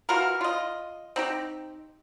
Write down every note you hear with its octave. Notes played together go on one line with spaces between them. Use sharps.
E3 F4 F#4 A#4
F4 D#5
C4 D#4 G4